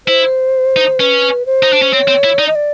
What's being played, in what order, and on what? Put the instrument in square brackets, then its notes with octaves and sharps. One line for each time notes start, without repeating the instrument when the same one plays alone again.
[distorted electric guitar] E4 [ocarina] C5
[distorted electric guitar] D#4
[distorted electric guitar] C#4 [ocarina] B4
[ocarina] C5
[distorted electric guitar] D#4
D4
C#4
[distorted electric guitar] C4 [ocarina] C#5
[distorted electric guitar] C4
E4
[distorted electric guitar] D#4 [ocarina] D5
[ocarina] D#5
D5